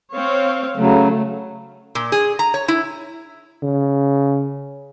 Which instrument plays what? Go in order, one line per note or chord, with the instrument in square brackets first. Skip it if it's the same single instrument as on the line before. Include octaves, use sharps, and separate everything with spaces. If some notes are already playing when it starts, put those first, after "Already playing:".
[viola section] C4 C#5 F5
[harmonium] C#3 F#3 [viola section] A3
[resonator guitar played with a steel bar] A#2
G#4
A#5
C#5
E4
[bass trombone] C#3